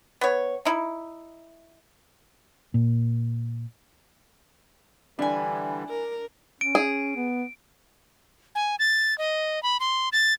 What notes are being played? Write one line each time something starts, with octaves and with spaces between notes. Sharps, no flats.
B3 C#5
D#4 E4
A#2
D3 E3 G3 D4 E4 G#5
A#4
C#4 D7
G#4
B3
G#5
A6
D#5
B5
C6
A6